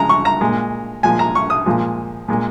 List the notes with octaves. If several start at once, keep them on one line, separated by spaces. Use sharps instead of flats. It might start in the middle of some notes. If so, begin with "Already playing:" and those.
Already playing: C#3 F3 G#3 A#5
C#6
A#5
A#2 G#3
A#2 F3 G#3 G#5
A#5
C#6
D#6
A#2 F3 G#3
A#2 G#3